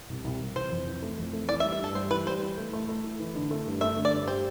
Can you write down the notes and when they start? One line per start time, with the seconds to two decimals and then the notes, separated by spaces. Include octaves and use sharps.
0.09 C2
0.24 C2
0.41 C2
0.56 E3 C5
0.71 F2
0.87 E3
1.02 A3
1.18 F2
1.33 A3
1.49 E3 D5
1.60 E5
1.64 G3
1.73 E5
1.79 G2 A4
1.95 G3 C5
2.11 E3 B4
2.26 G3 C5
2.42 E3
2.57 A3
2.73 A3
2.89 A3
3.04 E4
3.19 E3
3.35 D3
3.51 A3
3.66 G2
3.81 A3 E5
3.97 D3
4.05 D5
4.13 G2
4.27 G4 C5